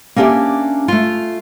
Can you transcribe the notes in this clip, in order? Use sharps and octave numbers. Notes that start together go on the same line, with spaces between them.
A#3 C#4 D4 G4 E5
A3 F4